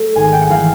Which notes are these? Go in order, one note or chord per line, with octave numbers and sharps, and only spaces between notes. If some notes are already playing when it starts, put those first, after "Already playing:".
Already playing: A3
G#1 G#5
G5
F#5
E3 F5